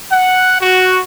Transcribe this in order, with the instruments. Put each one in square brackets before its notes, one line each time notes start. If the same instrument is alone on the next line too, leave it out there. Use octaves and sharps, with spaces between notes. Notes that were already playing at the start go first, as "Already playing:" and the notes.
[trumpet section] F#5
F#4